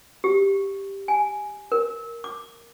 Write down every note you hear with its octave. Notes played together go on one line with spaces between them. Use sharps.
G4
G#5
A#4
D6